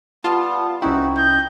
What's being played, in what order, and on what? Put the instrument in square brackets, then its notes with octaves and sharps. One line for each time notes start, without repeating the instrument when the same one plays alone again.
[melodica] G3 B3 [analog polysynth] F4 A5
[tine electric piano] C2 C#4 G5 [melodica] D#4 F#4 [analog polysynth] E4
[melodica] D#5 [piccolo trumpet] G6